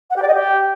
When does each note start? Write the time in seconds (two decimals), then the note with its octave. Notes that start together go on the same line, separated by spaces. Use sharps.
0.10 F#5
0.16 G4
0.22 D5
0.28 D#5
0.34 G4